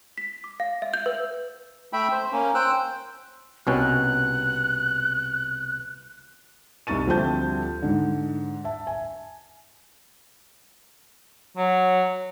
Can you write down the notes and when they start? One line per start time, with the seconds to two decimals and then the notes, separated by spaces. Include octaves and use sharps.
0.18 B6
0.44 D6
0.60 F5
0.82 E5
0.94 G6
1.06 B4
1.93 A3 E5 G5 B5
2.12 C5
2.32 A#3 C#4
2.55 C5 G5 E6 F#6
3.67 C2 B2 C#4 F#6
6.87 C2 D#4 C#6 A6 D#7
7.07 D2 F3 G3 C4 A5 G6
7.82 G#2 D3
8.65 E5 A5
8.87 G#5
11.57 F#3